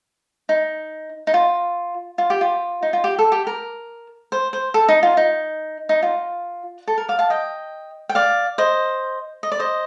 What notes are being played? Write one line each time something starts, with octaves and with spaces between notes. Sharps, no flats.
D#4
D#4
F4
F4
G4
F4
D#4
F4
G4
A4
G4
A#4
C5
C5
A4
D#4
F4
D#4
D#4
F4
A4
A#4
D5 F5
F5 A5
D#5 G5
G5
D5 F5
C5 D#5
D#5
D5
C5 D#5